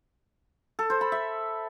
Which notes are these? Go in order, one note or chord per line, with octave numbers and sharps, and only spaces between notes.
A4
C5
B5
E5